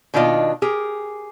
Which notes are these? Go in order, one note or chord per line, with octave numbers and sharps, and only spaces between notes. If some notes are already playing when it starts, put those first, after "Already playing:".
B2 D#3 A#3 D4 F4 D#5
G4 G#4 A#4